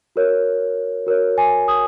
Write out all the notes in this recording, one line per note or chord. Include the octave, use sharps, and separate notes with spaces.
F#4 A#4 C#5
F#4 A#4 C#5
G#5
D#6